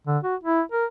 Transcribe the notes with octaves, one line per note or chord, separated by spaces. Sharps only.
D3
F#4
E4
A#4